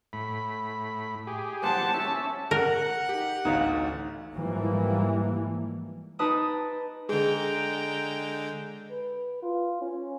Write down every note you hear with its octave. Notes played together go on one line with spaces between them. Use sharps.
A2 B5
G4 G#4
G4 C5 F#5 A5
C#4 E5
A#4 F#5
D#4 G4
A1 D2 D#4 C#5 F5
G#2 E3 F3 G3 A#3
D#4 G4 B4 A5 D#6
D3 G#3 G#4 G5 A#5
B4
F4
C#4